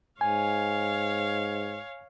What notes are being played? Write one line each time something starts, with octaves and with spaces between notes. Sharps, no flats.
G#2 C#5 F5 G#5